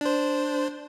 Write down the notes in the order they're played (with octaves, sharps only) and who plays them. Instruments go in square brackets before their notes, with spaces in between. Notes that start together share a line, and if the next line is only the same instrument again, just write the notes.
[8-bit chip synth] D4 C5